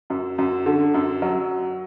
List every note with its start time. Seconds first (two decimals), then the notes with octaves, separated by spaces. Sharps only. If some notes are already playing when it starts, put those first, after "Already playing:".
0.10 F#2
0.38 F#2
0.66 D3
0.94 F#2
1.22 F#3